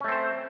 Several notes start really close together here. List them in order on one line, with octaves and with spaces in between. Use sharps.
C#4 A3 C4 C5